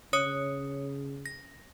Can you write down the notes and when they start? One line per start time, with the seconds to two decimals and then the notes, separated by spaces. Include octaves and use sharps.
0.13 C#3 C#5 D#6 C#7
1.26 A#6